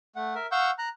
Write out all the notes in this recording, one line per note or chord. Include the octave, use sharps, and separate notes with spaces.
A3 F#5
A#4 E5
F5 F#5 C#6 E6 G6
A#5 F#6